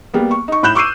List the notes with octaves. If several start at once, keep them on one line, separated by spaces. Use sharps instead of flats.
G3 A#3 B3
C#6
D#4 C#6
A2 B5 F#6 G6 E7
C#6 D6 E6 C7 D#7